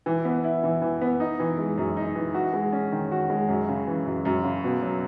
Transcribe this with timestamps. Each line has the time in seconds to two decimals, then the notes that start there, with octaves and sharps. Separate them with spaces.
0.06 E3
0.25 B3
0.44 E4
0.63 E3
0.82 E3
1.01 B3
1.20 D#4
1.40 E3
1.58 G#3
1.78 F#2
1.97 D#4
2.15 E3
2.34 F#4
2.53 G#3
2.72 C#4
2.92 D#3
3.11 F#4
3.30 G#3
3.49 F#2
3.68 C#3
3.87 E3
4.06 F#2
4.25 F#2
4.44 C#3
4.64 B2
4.82 F#3